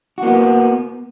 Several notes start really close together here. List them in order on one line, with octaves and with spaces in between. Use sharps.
F#4 A#3 B3